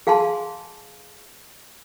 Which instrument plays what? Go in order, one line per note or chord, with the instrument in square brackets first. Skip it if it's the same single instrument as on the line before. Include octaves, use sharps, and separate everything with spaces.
[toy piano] G#4 F5 G#5 A5 C6